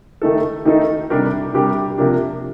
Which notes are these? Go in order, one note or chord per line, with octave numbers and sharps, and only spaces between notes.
D#3 A3 D#4 A4
D#3 A3 D#4 A4
C3 G3 D4 G4 A#4
C3 G3 D4 G4 A#4
C3 F3 A#3 D4